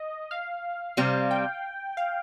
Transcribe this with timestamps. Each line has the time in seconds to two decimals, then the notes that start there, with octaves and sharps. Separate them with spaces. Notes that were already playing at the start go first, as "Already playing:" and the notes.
Already playing: D#5
0.31 F5
0.97 C3 G3 C4 F5
1.31 G5
1.97 F5